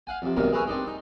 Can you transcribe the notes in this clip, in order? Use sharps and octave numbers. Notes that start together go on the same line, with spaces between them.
F5 F#5 G#5
F2 C3
B1 G2 C3 D#3 A#3 A#4
G#4 A#4 B4 C#5 E5 G#5
C4 D4 D#4
D#4